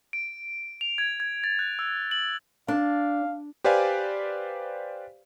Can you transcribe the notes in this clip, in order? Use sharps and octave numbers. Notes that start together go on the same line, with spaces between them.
D7
F7
G#6
G#6
A6
F#6
E6
F#7
D4 F5
G4 B4 C5 D5 F5 G#5